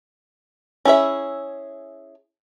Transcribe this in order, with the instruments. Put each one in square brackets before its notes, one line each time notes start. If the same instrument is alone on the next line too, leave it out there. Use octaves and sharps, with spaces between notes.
[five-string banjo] C#4 E4 G#4 E5